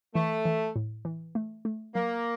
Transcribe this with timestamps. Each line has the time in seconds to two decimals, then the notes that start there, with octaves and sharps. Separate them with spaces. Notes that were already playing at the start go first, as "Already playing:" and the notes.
0.15 E3 A3
0.45 E3
0.76 A2
1.05 E3
1.35 A3
1.65 A3
1.95 F#3 A#3